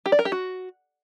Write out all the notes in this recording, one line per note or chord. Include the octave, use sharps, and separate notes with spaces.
G4
D5
A#4
G4
F#4